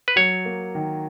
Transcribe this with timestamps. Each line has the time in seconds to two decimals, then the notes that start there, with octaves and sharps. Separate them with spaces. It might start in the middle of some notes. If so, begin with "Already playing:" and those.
0.08 B4
0.16 F#3 C#5
0.45 A#3
0.75 D#3